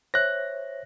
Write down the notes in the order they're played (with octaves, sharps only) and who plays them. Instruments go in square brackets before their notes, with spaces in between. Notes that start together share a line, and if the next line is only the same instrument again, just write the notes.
[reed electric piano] C5 C#5 E5 [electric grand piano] F#6 A#6